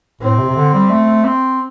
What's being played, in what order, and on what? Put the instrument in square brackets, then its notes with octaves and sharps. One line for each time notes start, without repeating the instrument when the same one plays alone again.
[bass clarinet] A2 [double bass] C4
[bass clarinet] C3
C3
D3
G3
A3
C4